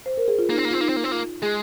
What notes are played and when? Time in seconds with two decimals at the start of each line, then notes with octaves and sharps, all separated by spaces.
0.06 C5
0.17 A#4
0.28 G#4
0.39 F4
0.50 A#3 D#4
0.58 C4
0.65 A#3
0.71 C4 F4
0.81 A#3 D#4
0.89 C4
0.96 A#3
1.04 C4
1.12 A#3 F4
1.42 G#3 G#4